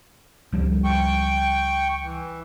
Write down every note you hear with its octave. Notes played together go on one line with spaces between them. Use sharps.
C#2 F3 G3
G5 C#6
E3